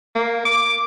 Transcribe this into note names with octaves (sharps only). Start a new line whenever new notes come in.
A#3
D6